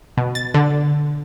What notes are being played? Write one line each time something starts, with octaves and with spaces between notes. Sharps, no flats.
B2
A6
D3